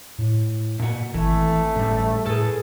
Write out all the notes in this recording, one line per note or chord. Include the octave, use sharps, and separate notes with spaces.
A2
A#2 F#4
G#1 E3 A3
A2 G3
A2 G#4 A4 B4